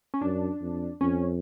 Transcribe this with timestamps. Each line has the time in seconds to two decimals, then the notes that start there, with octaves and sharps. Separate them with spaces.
0.14 C#4
0.22 F#2 D4
0.61 F2
1.01 F2 C#4